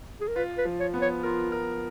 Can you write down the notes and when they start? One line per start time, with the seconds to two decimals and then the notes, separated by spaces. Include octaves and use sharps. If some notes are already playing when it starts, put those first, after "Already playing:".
0.21 G#4
0.28 A#4
0.36 F4 B4
0.58 B4
0.65 F3
0.80 C#5
0.94 B3
1.02 C#5
1.23 F4 A#4
1.52 A#4